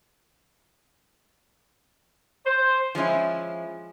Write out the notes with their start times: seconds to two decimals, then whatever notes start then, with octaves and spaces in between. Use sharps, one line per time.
2.46 C5
2.95 F3 G#3 C#4 E4